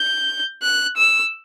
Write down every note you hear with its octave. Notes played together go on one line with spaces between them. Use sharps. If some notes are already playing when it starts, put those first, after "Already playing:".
Already playing: G6
F#6
E6